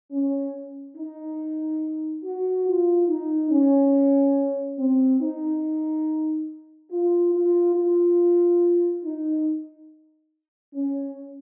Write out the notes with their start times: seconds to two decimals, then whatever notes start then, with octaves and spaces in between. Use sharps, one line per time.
0.11 C#4
0.96 D#4
2.23 F#4
2.66 F4
3.08 D#4
3.51 C#4
4.78 C4
5.21 D#4
6.91 F4
7.33 F4
7.76 F4
9.04 D#4
10.73 C#4